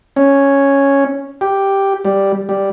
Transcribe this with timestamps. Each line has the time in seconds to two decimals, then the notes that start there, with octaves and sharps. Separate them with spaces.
0.16 C#4
1.41 G4
2.05 G3
2.49 G3